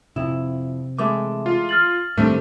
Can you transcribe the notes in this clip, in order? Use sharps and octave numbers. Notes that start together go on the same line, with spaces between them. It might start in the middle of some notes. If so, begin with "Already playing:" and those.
F2 C3 E4
E3 G#3 A3 D6
F4
F6 A6 F#7
A2 D#3 G3 A3 C4 D4